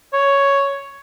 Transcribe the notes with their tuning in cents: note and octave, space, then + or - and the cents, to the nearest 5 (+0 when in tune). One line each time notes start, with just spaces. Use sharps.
C#5 +5